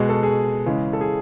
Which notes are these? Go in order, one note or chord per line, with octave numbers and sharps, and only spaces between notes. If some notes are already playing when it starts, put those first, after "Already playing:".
Already playing: B2 G#3 F#4 G#4
A4
G#4
C#3 E3 G#3
A4
G#4